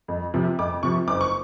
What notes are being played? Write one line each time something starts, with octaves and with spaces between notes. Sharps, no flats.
F2
C3 F3
F2 D6
C3 F3 C#6
F#1 D6
C#6